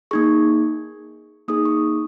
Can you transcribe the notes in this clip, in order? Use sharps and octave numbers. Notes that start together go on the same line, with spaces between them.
A#3 D#4 G#4 C#6
A#3 D#4 G#4 D#6
C#6